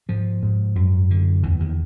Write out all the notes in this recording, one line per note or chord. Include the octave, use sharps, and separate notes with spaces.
G#2 F3
G#2
F#2
D3
E2 E3
D#3